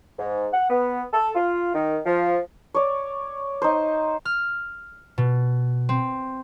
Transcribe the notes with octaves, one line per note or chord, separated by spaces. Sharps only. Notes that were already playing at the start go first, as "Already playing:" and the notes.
G#2
F#5
B3
A4
F4
D#3
F3
C#5 D5
D#4 C5
F6
B2
C4